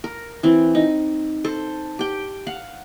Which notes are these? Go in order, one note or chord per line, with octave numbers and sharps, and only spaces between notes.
A#4
E3 C4
D#4
A4 C5
G4 G5
F5 F#5